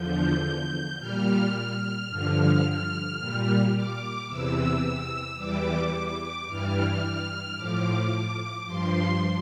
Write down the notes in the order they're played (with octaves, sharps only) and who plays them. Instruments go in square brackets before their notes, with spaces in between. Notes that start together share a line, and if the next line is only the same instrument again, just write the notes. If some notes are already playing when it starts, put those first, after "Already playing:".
Already playing: [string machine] E2 D3 F3 G6
A#2 G3 F6
F6
G2 D3 F3 F6
A#2 G3
D6
E2 C3 E3 E6
E2 E3 G3 D6
D6
G2 E3 G3 F6
F6
A2 F3 D6
G2 F3 C6